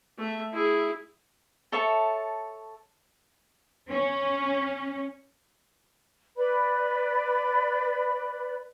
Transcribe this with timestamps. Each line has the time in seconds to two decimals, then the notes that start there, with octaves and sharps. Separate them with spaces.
0.18 A3 E5
0.53 E4 G#4
1.72 A4 C#5 E5 A5
3.91 C#4
6.37 B4 D5 B5